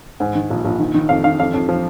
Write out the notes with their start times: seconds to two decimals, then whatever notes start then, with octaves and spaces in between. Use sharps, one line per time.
0.20 G#2
0.35 D#3
0.50 A#1
0.65 A#1
0.79 D#3
0.94 D#3
1.09 F2 F5
1.24 D#3 F5
1.40 F2 F5
1.54 F2
1.69 F3